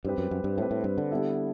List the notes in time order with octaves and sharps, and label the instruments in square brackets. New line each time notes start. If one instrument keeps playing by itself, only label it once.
[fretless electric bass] G2 [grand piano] G3 C4 G4 B4
[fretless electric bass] F#2
F#2
G2
[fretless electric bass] A2 [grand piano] G3 C4 G4 B4
[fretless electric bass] A2
G2
D3
[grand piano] G3 B3 E4 A4